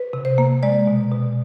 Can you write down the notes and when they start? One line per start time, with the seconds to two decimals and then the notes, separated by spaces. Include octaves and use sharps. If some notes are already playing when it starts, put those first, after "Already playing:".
Already playing: B4
0.13 C3
0.25 C5
0.38 A#3
0.63 G#3 D5
0.87 B2
1.12 B2